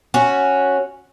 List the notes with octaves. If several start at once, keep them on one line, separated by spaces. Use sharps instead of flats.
C#4 F#4